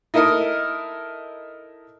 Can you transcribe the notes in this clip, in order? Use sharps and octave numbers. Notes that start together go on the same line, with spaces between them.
D#4 E4 A4 A#4 D#5